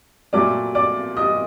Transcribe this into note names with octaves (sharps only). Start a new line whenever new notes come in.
A#2 F#3 A3 D5 D6
D5 D6
D#5 D#6